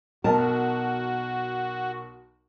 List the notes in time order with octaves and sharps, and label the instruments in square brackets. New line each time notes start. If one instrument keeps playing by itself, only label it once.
[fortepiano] B1 A#4 [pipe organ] F#4 [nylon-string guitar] A5